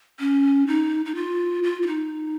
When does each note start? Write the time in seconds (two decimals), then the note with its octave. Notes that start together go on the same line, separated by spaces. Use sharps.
0.20 C#4
0.67 D#4
1.06 D#4
1.15 F4
1.63 F4
1.83 F4
1.87 D#4